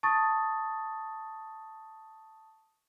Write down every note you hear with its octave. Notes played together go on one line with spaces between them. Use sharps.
A5 C#6 D#6 A6